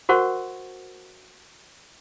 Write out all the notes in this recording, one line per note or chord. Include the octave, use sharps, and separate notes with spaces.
F#4 A#4 C5 F#5 C#6